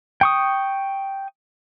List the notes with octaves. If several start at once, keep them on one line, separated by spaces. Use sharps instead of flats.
G5 C#6 D#6